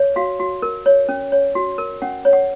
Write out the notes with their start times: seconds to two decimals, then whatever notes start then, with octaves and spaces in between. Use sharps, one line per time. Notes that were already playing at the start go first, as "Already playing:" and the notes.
Already playing: C#5
0.16 F#4 F5
0.40 F#4
0.62 A#4
0.86 C#5
1.09 C#4
1.32 C#5
1.55 F#4
1.78 A#4
2.02 C#4 F#5
2.25 C#5
2.33 F#5